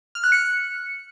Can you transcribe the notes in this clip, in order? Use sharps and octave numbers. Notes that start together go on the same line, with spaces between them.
F6
F#6
C#7